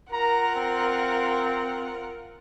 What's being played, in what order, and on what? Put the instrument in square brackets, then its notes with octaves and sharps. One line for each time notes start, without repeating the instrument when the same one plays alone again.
[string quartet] F4 A#4 F#5 [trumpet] A#5
[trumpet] C4